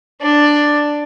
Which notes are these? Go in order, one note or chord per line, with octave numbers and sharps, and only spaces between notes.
D4 D5